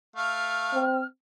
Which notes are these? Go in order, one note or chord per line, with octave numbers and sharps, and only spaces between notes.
A3 F5 F6
C4